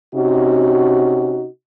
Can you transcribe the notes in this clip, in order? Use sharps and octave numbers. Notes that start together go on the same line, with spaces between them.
C3 C#4 D#4 F#4